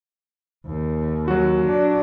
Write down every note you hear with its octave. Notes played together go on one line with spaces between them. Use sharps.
D#2
F#3 F#4
D4